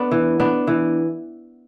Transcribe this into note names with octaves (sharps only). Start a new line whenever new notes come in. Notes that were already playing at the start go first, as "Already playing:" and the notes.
Already playing: B3 D4
E3
B3 D4
E3